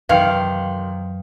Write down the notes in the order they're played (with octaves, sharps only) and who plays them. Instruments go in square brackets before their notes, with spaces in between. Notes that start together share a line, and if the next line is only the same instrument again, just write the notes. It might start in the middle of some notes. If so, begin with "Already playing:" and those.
[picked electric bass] F#2 E3 F#3 [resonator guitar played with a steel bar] C3 D#3 [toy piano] B4 G5 [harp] F5